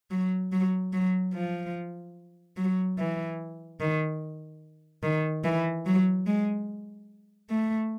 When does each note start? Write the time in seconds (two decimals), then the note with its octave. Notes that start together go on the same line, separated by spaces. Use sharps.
0.11 F#3
0.52 F#3
0.93 F#3
1.34 F3
2.57 F#3
2.98 E3
3.80 D#3
5.03 D#3
5.44 E3
5.86 F#3
6.27 G#3
7.50 A3